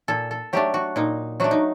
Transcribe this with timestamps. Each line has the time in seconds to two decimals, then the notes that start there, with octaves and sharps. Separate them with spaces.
0.08 A#2 A4
0.31 A4
0.53 F#3 A3 D4 G4
0.74 F#4
0.96 A#2 D#4
1.40 F#3 A3 D4 F#4
1.51 D#4